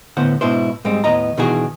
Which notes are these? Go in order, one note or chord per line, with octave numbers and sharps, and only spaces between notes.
A2 D3 B3 C5 F#5
G#2 B2 D4 E4 C5
G#2 G3 G#3 C4
D#2 A2 B3 D#5 A#5
B2 D#3 E3 D4 F#4 G#4